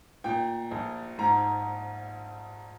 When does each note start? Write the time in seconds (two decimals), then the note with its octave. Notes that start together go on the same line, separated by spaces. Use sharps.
0.24 A#2 G5
0.71 A#1
1.18 G#2 A#5